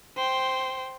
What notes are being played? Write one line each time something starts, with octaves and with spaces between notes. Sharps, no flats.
C5 G5